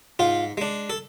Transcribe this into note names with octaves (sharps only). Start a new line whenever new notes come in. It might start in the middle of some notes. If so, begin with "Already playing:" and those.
G#2 F4
G#3 D4
A4